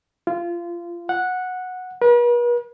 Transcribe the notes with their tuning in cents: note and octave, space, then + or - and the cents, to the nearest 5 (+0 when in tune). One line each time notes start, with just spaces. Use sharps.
F4 -20
F#5 -10
B4 -45